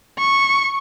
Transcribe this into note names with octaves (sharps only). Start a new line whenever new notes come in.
C#6